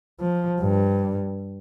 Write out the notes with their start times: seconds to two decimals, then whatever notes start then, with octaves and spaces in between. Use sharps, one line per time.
0.20 F3
0.61 G2